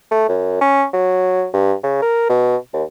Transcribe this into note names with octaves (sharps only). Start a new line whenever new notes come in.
A3
F#2
C#4
F#3
G2
C#3
A#4
B2
D#2